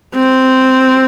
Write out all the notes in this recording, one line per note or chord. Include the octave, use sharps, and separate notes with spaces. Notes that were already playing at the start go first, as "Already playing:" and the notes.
C4